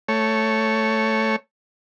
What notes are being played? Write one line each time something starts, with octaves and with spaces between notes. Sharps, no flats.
A3 C#5